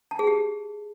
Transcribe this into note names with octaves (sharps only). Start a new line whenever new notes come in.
A5
G#4
G4